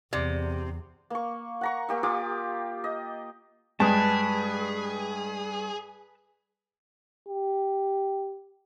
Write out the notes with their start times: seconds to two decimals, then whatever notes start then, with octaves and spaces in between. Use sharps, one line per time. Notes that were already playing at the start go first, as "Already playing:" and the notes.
0.13 E2 C3 D5
1.10 A#3 C#6
1.61 F#5 A#5 C#6
1.89 A#3 G4 E5
2.03 F4 G4 D6 D#6
2.84 D#5
3.80 G2 G#3 G#4 B4 G5 A5 D#6
7.29 G4